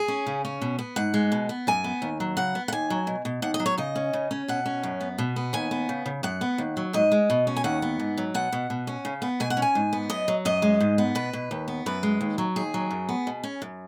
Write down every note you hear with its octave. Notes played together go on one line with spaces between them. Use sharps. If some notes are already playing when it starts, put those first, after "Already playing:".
Already playing: G#4
C#4
C#3
C#4
B2
B3
G#2 F#5
G#3
B2
B3
F#2 G#5
B3
D#2
F#3
C#3 F#5
B3
F#5
D#2 G#5
F#3
B2
B2
D#2 F#5
D#5
F#3
C#5
C#3 D#5
C#4
C#3
C#4
B2 F#5
C#4
F#2
B3
B2
B3
D#2 G#5
B3
C#3
C#3
F#2 F#5
B3
D#2
F#3
G#2 D#5
G#3
B2
C#4
G#5
D#2 F#5
B3
G#2
F#3
B2 F#5
B2
B2
C#4
C#3
B3
B2 G#5
F#5
C#4
G#5
G#2
B3
F#2 D#5
F#3
F#2 D#5
G#3
G#2
B3
B2 B4
B2
D#2
B3
F#2 B4
G#3
D#2
F#3
D#2 G#4
F#3
F#2
B3
B2
C#4
F#2